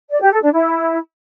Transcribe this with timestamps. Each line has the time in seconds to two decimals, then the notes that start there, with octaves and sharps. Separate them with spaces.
0.11 D5
0.21 G4
0.32 A4
0.42 D4
0.53 E4